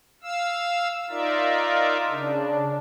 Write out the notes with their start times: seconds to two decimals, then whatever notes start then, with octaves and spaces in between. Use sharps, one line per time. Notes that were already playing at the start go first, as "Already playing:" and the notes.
0.22 F5 E6
1.10 D#4 F4 A#4 D5 E5
2.09 C#3 D4